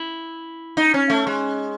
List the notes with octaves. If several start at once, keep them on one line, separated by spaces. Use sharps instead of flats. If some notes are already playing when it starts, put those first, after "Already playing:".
Already playing: E4
D#4
C#4
A3
G#3